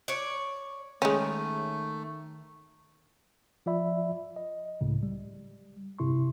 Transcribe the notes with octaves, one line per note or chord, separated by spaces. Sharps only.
C#5 D5
D#3 G#3 A3 C#4
F3 F4 D5 E5 B5
D#5
C#2 A2 C#3
G3
G2 C3 E4 C6 C#6